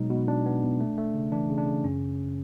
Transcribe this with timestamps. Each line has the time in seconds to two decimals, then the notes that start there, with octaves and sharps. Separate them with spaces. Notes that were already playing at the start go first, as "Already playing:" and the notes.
Already playing: B2 F#3 G#3 D#4
0.10 B2
0.28 B2 D4
0.46 B3
0.63 B2
0.80 A3
0.98 A3
1.14 C#3
1.32 E3 D4
1.50 C#3
1.58 D4
1.66 C#3
1.84 F#2 C#4
2.01 F#2